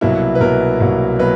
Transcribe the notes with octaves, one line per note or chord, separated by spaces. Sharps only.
C2 B2 F#3 A#3 E4
B4
C2 B2 F#3 A#3 A#4
C2 B2 F#3 A#3
B2 F#3 A#3 B4